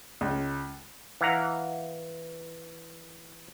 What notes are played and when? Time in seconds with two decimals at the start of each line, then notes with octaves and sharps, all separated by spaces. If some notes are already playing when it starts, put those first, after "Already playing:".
0.21 C#2
1.21 E3 F5 F#5 A#5